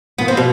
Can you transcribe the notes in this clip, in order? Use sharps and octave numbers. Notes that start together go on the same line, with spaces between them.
G#2 F3 A#3 B3
C4
B2